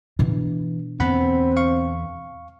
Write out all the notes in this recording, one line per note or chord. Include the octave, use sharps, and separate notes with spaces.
B2 E3 D4
E2 D3 B3 C4 F#5 B5
F5 C#6